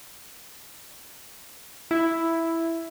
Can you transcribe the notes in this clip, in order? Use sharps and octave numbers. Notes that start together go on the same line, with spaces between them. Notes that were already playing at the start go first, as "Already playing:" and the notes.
E4